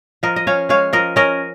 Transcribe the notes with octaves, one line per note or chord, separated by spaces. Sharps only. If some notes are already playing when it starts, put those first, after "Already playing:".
F3 A#4 D#5
D#5
C#4 C#5 F5
G#3 C#5 F5
F3 A#4 D#5
C#4 A#4 D#5